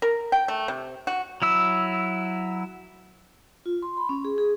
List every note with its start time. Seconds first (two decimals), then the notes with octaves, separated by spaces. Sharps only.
0.02 A#4
0.32 G5
0.48 A3
0.68 C3
1.07 F#4
1.42 F#3 E4 E6
3.66 F4
3.82 C6
3.97 B5
4.09 C#4
4.25 G#4
4.38 G#4